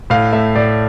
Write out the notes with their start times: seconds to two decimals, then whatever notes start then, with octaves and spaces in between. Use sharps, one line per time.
0.10 A2 F5
0.33 A3 E5
0.55 A2 D5